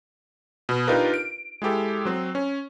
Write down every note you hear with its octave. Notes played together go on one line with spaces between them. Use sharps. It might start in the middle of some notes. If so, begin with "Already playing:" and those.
B2
D4 D#4 F4 G4 A#4 B4
D7
G#3 E4 G4 A4
F#3 C4
C#4